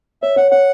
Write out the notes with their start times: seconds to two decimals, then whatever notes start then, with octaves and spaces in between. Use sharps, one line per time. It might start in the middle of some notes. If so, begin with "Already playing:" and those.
0.22 C#5 E5
0.36 C#5 F#5
0.51 C#5 F#5